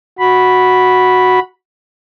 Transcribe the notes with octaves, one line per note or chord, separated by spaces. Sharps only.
F#4 B5